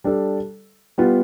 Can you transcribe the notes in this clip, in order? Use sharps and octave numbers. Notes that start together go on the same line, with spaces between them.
G3 D4 A4
G3 B3 F4